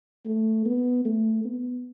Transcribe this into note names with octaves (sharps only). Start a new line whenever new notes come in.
A3
B3
A3
B3